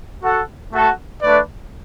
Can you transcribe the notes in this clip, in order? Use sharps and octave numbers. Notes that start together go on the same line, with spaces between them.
F#4 A4 F#5
A3 F#4 A4 F#5
A3 D4 B4 D5